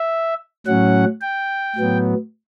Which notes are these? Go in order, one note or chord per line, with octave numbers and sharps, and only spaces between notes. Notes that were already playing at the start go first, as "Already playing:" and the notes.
Already playing: E5
A2 F#3 C#4 F#5
G5
A2 F#3 B3